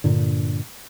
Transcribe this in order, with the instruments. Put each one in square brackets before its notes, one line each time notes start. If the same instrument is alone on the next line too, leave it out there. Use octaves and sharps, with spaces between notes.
[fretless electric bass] G2 A#2 D3